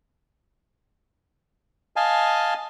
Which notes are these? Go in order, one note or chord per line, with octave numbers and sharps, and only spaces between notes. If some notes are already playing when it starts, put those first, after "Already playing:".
D#5 F5 G#5 A5